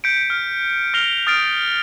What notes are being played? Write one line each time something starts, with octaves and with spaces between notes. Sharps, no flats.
G6 B6 C#7 D7
F6
F6 A#6 C7 D7 F7 G7
D#6 F6 A6 C7 D7